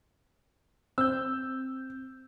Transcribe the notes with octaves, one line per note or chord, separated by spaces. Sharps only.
C4 E6 G6